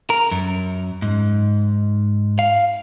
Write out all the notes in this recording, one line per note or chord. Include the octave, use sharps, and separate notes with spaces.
A#4
F#2
G#2
F5